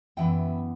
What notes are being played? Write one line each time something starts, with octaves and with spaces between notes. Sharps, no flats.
F#2 E3 B3 E5 G5